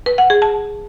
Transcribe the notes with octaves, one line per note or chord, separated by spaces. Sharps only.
B4
F#5
G#4
A5